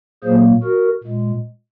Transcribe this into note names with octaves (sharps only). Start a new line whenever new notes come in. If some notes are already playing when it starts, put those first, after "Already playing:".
A#2 F#3 A#3 G#4 C5
F#4 A#4
A#2 G#3